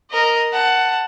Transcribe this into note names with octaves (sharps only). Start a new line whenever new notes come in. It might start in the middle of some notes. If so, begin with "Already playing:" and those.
A#4 D#5
F#5 A5